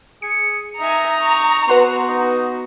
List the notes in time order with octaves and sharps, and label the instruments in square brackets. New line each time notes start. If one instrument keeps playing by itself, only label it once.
[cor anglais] G#4 [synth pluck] C#7
[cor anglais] D#4 [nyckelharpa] E5 G#5 [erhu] A#5
[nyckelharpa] C#6
[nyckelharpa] B3 F#4 [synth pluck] B4 F#5 C6
[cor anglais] D#4